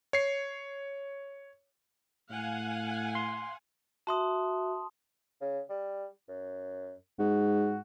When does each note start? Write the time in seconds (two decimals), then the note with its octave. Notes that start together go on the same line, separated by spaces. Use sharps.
0.13 C#5 C7
2.30 A2 F5 F#5 G#5
3.15 C6
4.07 F#4 E5 A5 C6 D#6
5.41 C#3
5.69 G3
6.29 F#2
7.19 G#2 F#4